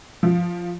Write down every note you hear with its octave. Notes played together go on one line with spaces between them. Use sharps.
F3